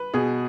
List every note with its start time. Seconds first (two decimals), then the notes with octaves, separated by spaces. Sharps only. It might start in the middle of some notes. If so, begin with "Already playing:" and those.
Already playing: B4
0.14 B2 G#4